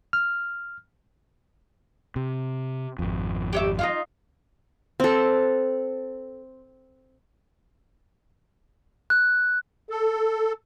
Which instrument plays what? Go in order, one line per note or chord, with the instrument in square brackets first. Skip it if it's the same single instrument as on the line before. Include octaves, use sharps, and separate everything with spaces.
[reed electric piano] F6
[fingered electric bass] C3
G#1 F2
[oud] G4 C#5 E5
D#4 F4 F5
[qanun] C4 A4
[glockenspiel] F#6
[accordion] A4